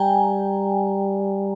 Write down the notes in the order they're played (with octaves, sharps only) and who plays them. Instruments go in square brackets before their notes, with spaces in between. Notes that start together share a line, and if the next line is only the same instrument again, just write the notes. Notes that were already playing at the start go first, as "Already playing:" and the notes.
Already playing: [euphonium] G3 [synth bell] G5 G#5 A#5